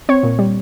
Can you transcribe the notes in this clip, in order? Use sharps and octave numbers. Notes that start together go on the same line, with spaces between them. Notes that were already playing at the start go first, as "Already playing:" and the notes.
C4 C#5
A#2
G3